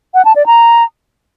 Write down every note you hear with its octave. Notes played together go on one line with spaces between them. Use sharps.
F#5
A5
D5
A#5